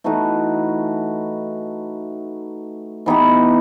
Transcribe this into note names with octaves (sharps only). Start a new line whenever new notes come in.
E3 A3 D#4 F#4
E3 B3 D#4 G4